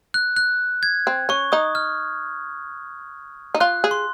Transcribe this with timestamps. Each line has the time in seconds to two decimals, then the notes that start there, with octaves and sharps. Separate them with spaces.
0.14 F#6
0.37 F#6
0.83 G#6
1.07 C4
1.29 C#4 C#6
1.52 D#4 D#6
1.75 F6
3.55 D#4
3.60 F4 F#6
3.84 G#4
3.91 C6